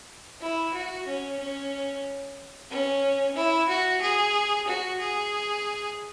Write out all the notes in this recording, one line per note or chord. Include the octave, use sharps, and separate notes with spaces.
E4
F#4
C#4
C#4
C#4
E4
F#4
G#4
F#4
G#4